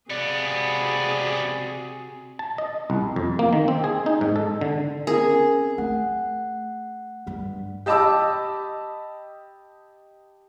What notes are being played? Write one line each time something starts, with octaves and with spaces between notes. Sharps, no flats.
C#2 C3 B3 F#4 G#4 D5
A5
D#5
C2
F2
A#3
D#3
C4
G#4
D#4
G#2
A4
D3
C4 C#4 G#4 A#4
A3 F#5
G2 G3
G4 D#5 A5 B5 D6 E6